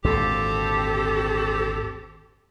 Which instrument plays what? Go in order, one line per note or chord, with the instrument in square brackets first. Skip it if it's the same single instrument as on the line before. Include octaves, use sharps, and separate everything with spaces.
[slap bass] G#1 D2 A#2 [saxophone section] C4 G4 A4